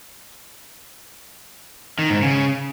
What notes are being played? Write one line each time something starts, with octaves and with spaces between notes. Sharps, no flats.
D#3
G#2
C#3